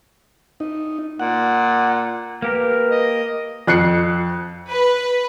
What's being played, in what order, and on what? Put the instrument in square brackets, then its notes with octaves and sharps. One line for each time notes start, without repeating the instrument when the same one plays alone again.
[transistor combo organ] D#4
[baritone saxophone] A#2 [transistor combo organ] F#5
[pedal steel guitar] A#3 G4 A#4 [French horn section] B4
[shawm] D#5
[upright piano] F2 F#6 C7 C#7
[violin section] B4